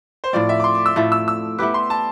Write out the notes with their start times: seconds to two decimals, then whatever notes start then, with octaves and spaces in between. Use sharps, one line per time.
0.24 C5
0.33 A2 F3 C4 D5
0.49 E5
0.60 D6
0.64 C6
0.75 D6
0.86 E6
0.96 A2 F3 A3
1.12 E6
1.28 E6
1.58 B3 E4 G4 B4 D6
1.74 C6
1.90 A5